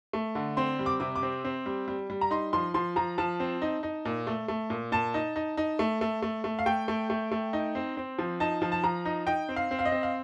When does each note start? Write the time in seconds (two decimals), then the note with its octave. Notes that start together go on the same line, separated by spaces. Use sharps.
0.13 A3
0.35 D3
0.57 C4 C6
0.79 G3
0.86 D6
1.00 C3 D6
1.15 D6
1.23 C4
1.44 C4
1.66 G3
1.88 G3
2.10 G3
2.21 A#5
2.31 D#4 C6
2.53 F3 C6
2.74 F3 C6
2.96 F3 A#5
3.18 F3 A5
3.40 C4
3.62 D#4
3.83 D#4
4.05 A#2
4.27 A3
4.48 A3
4.70 A#2
4.92 A#2 A5
5.14 D#4
5.36 D#4
5.57 D#4
5.79 A3
6.01 A3
6.22 A3
6.44 A3
6.59 F5
6.66 A3 G5
6.88 A3
7.10 A3
7.31 A3
7.53 D#4
7.75 C4
7.97 C4
8.18 F3
8.40 D#4 A5
8.62 F3
8.72 A5
8.83 F3 A#5
9.05 D#4
9.27 D#4 G5
9.49 C4
9.56 F5
9.71 C4
9.79 F5
9.85 D#5
9.92 C4
10.03 F5